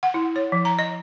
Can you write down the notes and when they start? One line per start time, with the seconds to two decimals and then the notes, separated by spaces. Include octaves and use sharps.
0.03 F#5
0.14 E4
0.36 C#5
0.52 F3
0.65 A#5
0.79 D#5